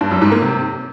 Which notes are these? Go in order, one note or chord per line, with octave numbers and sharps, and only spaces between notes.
G2
F#2
G#2
A#3
C3